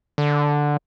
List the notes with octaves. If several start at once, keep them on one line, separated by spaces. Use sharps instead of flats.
D3